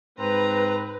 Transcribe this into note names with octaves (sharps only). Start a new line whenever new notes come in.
G#2 C4 B4 A#5